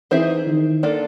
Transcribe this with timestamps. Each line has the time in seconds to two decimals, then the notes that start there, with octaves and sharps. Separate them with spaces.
0.11 E3 C4 D#4 G#4 C5 E5
0.47 D#3
0.83 A#3 D4 F4 A4